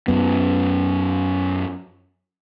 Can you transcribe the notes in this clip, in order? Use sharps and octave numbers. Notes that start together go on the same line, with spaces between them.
F#2 B3